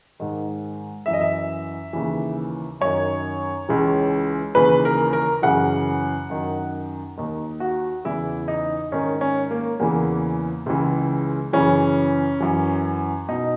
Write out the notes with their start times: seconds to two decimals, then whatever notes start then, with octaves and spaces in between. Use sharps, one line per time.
0.20 G#2 D#3
1.06 F#2 E3 E5
1.13 D#5
1.21 E5
1.93 D#2 C#3 E3
2.81 F#2 D#3 C#5
3.69 C#2 C#3 E3
4.55 D#2 C#3 E3 B4
4.85 A#4
5.13 A#4
5.42 F#2 C#3 E3 F#5
6.30 F#2 D#3
7.17 D#2 D#3
7.60 F#4
8.05 E2 C#3 E3 E4
8.48 D#4
8.91 G#2 D#3 C#4
9.21 C#4
9.51 A#3
9.80 E2 C#3 E3 A#3
10.66 C#2 C#3 E3
11.53 F#2 C#3 E3 C#4
12.40 F#2 E3
13.29 B2 D#4